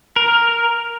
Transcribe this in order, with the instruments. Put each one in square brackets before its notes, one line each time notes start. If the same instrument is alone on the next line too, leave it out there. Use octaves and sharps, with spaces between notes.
[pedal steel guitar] A#4